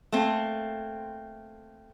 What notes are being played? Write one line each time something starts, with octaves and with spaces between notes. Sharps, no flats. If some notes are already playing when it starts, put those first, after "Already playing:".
A3 A#3 C4